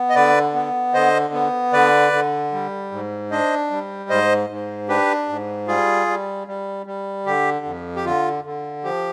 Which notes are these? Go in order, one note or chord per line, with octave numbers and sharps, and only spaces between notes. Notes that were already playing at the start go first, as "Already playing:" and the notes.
Already playing: B3
D#5
D3 B4 D5
B3
D3 C5 D#5
B3
D3 B4 D5
D3
G3
G#2
D4 C5 D#5
G3
G#2 C5 D#5
G#2
D4 G4 B4
G#2
G3 F4 G#4
G3
G3
G3
D3 G4
F2
G4
D3 F4
D3
F3 G4